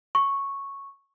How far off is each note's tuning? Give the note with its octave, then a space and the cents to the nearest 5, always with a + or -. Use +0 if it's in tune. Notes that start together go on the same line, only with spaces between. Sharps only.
C#6 -5